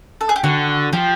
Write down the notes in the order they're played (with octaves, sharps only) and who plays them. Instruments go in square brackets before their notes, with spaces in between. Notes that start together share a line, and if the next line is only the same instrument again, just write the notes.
[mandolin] A4
G#4
G4
[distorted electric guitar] D3 [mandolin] F#4
[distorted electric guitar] F3 [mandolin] G4